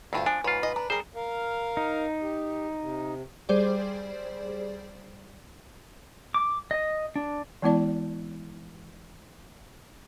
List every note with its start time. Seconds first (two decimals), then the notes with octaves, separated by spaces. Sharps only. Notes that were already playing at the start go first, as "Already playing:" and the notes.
0.13 D2 G2 E4 F4 C5
0.26 F3 D4 G#5
0.44 G#2 F4 B4 C#5
0.63 D#5
0.76 D4 A#5
0.90 G3 G#4 A#4 C5
1.15 A#4 F5
1.77 D#4
2.22 G4
2.81 C3
3.49 G3 G#4 C5 D5
6.34 D6
6.71 D#5
7.16 D4
7.62 E3 G#3 B3 E4 D5 A5